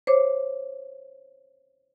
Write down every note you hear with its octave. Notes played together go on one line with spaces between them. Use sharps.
C5 C#5 D6